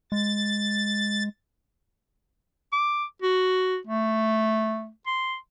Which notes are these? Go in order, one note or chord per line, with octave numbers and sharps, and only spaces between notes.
G#3 A6
D6
F#4
A3
C6